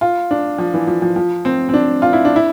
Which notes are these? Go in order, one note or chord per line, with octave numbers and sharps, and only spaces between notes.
F4
D4
F3
E3
F3
F3
F3
C4
C4
D4
F4
E4
D4
E4